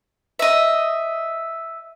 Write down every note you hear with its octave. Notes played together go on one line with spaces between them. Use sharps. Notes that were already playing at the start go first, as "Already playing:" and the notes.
D#5 E5